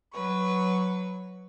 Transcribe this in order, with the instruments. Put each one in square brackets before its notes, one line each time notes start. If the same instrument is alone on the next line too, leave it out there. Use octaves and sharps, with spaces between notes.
[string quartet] F#3 B4 C#6